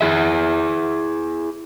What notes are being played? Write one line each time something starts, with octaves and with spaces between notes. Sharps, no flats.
E4 G#4 E5